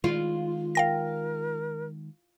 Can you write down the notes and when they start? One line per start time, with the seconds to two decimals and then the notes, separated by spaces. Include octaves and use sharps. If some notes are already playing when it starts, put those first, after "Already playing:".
0.04 D#3 G#3 F4
0.75 A#4 F5 G5 A#6